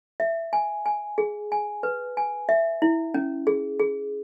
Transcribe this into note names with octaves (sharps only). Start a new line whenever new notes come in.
E5
G#5
G#5
G#4
G#5
B4
G#5
E5
E4
C#4
G#4
G#4